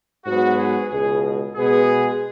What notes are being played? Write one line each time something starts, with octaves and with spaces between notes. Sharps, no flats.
G#2 F#3 B3 F#4
G#4
C#2 B2 G#3 G#4
B2 G#3 B3 G#4